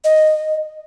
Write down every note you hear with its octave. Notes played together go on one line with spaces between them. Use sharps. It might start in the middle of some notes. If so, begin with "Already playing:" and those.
D#5